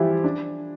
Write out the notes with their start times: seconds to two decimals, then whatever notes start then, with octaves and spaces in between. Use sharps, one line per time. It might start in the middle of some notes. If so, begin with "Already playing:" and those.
Already playing: E3 F3 G3 E4 F4 G4
0.24 D4